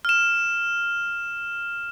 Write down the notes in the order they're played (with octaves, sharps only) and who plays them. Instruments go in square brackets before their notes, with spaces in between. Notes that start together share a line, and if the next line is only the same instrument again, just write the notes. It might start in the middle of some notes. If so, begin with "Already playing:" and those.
[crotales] F6 E7